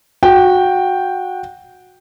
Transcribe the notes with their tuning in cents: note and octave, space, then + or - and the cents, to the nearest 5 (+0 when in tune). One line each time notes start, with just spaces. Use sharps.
F#4 -15 G5 +0